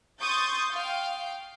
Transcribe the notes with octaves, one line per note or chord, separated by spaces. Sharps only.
C6 C#6 D#6 G6 A6
F5 G5